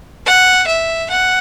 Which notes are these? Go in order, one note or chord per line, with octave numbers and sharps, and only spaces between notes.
F#5
E5
F#5